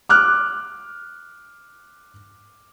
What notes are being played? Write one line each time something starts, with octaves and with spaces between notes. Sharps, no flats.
D6 F6 F#6